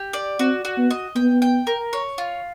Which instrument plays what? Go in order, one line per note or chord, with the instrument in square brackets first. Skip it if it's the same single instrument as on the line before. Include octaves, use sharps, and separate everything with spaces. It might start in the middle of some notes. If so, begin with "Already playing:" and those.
Already playing: [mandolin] G4
D5
[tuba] C4 [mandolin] F#4
[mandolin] F#4
[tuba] B3
[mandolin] D#5
[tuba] B3 [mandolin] G5
[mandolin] G5
A#4
C#5
F4